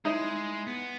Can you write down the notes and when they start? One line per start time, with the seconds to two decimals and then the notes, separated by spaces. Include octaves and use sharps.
0.05 G#3 D#4 E4 D#5
0.67 B3